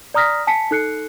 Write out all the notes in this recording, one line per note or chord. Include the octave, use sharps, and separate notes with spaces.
D5 A#5 D#6 F6 A#6 B6
G#5 A5 B6 C#7
D#4 A4 F#6 C7 C#7